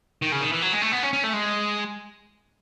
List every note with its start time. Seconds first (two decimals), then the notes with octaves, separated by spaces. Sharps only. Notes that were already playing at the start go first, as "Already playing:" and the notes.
0.22 D#3
0.32 C#3
0.41 D#3
0.53 E3
0.62 F#3
0.73 G#3
0.82 A3
0.92 B3
1.03 C#4
1.13 C#4
1.23 A3
1.33 G#3